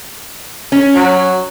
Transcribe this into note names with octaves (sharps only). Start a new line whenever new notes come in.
C#4
F#3